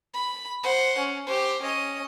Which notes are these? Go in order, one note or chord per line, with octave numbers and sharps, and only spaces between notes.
B5
C5 F#5
C#4
G4 C5
C#4 D#5